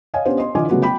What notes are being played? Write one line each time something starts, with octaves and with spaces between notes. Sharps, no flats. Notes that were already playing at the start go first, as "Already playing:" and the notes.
C#5 D#5 F5 G#5
B3 C#4 D4 G4 C5
D#5 C6
D3 E3 F4 D#5 G#5 D6
C#3 F#3 A3 B3 F#4 B4
G5 B5